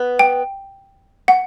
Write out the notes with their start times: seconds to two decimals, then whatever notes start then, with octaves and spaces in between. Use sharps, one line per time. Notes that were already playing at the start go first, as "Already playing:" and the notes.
Already playing: B3 B4
0.19 G5
1.28 F#5